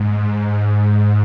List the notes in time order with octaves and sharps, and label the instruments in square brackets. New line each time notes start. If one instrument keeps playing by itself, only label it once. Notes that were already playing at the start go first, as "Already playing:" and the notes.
Already playing: [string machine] G#2